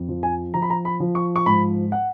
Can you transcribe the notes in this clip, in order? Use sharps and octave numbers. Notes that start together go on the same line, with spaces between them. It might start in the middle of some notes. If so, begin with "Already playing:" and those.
Already playing: F2
F3
G#5
F3 A#5
B5
A#5
B5
F3
C#6
C#6
G#2 B5
F#5